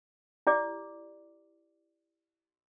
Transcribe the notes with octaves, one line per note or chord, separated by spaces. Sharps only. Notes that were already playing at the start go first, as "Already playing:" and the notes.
E4 G4 D5 D6